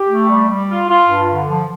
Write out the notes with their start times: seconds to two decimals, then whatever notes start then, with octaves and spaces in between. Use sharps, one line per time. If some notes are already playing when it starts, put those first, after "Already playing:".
Already playing: G4
0.08 A3
0.29 G3
0.48 G3
0.69 F4
0.89 F4
1.08 G2
1.29 D3
1.49 F3